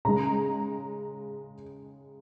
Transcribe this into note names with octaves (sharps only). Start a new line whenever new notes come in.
C#3 G#3 A#5